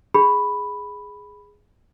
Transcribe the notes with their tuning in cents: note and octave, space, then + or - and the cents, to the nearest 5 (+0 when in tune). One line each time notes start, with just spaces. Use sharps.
G#4 +0 B5 +0